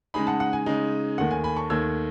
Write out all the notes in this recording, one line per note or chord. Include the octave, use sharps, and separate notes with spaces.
C#3 G#3 D#4 G#5 B5
F#5 A5
F#5
G#5
C#3 G#3 D#4
D#2 D#3 A3 F#5
G#5
G#5 B5
A5 C#6
D#2 D#3 A3 E6 G#6